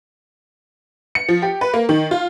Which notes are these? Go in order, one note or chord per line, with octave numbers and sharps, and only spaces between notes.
C#7
F3
G4
B4
A#3
D#3
F4